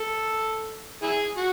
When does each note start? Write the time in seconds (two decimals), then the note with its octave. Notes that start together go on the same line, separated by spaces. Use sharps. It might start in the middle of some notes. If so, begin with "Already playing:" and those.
Already playing: A4
1.03 E4 G#4
1.37 F#4